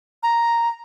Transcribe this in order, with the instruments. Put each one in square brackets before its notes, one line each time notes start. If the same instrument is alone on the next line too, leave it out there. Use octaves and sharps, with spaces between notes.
[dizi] A#5